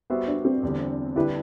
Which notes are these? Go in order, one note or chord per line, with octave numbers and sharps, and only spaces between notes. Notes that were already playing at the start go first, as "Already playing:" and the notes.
G3 B3 F#4 C5 E5
D4
C4
E2 D3 G3
D3 G3 D4 E4 G4 B4